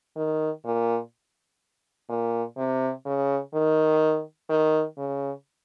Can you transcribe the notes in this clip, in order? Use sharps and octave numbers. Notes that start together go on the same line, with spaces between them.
D#3
A#2
A#2
C3
C#3
D#3
D#3
C#3